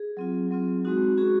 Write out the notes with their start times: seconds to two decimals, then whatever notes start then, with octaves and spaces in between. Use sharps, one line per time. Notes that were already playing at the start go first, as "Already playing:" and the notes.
Already playing: G#4
0.17 F#3 C4 F4
0.51 F#3 C4 F4
0.85 G#3 C4 D#4 F#4
1.17 G#3 C#4 F#4 G#4